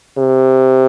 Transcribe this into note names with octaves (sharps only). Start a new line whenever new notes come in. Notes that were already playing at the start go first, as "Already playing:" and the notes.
C3